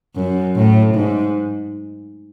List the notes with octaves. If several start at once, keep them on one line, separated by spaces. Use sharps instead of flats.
F#2
A2
G#2